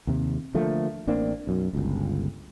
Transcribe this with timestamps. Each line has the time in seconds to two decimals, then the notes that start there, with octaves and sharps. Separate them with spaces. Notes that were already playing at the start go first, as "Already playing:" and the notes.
0.07 D#2 C3
0.54 D3 F3 A3 A#3
1.07 A1 A#3 C4 D4
1.47 B1 F#2
1.73 G1 C#2